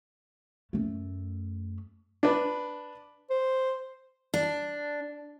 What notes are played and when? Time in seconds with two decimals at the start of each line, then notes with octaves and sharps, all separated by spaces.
0.73 F#2 A3
2.23 D4 B4
3.30 C5
4.34 D4